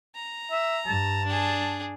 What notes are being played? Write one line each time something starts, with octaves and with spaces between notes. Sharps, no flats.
A#5
E5
G2 A5
D4 G#4